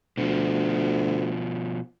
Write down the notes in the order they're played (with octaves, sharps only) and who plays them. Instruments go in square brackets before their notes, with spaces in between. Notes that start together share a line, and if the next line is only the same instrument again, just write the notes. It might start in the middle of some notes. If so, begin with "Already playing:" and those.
[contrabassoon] D2 [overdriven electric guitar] B2 F3